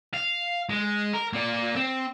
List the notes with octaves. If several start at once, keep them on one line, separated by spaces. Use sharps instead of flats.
F5
G#3
A#4
A#3 D5
C4